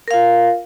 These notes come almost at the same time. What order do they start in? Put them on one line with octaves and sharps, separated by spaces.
A#4 F5 F4